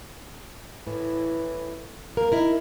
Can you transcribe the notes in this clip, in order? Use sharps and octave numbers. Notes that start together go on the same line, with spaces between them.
A2 E3
A#3 A#4
D#4 E4 A#4